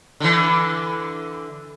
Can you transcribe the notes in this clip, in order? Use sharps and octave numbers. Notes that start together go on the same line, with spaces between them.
D3 E3